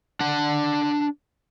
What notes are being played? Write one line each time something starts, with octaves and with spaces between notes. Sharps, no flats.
D4 F#5